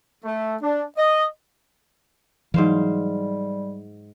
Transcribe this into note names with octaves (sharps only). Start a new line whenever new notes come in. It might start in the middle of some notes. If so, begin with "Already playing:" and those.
A3
D4
D#5
G#2 E3 F#3 G3 C5 F5